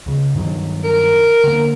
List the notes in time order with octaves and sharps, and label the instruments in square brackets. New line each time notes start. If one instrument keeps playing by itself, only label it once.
[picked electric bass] C#2 C#3
G2 D#3 F#3
[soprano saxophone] A#4
[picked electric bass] D3 A#3